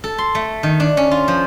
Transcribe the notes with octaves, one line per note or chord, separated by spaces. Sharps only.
A4
C6
A3
D#3
D4
C#4
F4
F3